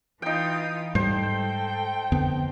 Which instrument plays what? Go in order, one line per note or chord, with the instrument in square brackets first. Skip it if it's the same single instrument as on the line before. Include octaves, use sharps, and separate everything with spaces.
[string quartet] E3 F4 D#6 [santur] D#4 G5
[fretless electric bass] G#2 G3 [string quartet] A4 G5 [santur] C5
[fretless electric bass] F2 D3 B3